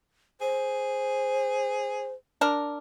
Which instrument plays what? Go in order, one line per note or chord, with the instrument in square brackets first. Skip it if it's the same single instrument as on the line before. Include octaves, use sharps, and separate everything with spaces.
[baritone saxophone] G#4 [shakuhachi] C5
[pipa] D4 A#4